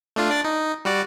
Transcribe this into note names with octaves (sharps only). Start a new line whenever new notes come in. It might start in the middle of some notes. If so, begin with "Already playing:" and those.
A3 D4 F4
D4 D5 A6
D#4
G3 F#4 D5